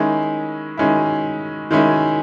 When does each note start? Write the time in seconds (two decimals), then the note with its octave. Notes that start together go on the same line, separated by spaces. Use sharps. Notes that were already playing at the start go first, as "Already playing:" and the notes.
Already playing: D#3 G#3 C#4 E4
0.77 D#3 G#3 C#4 E4
1.71 D#3 G#3 C#4 E4